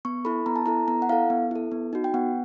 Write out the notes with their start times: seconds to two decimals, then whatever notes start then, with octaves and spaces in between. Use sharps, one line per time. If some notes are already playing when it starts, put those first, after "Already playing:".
0.05 B3 C#6
0.25 E4 A4 B5
0.46 B3 A#5
0.56 A5
0.66 E4 A4 A#5
0.88 B3 A#5
1.02 F#5
1.09 E4 A4 F5
1.30 B3
1.51 E4 A4
1.72 B3
1.93 D#4 F#4
2.04 G5
2.14 B3 F#5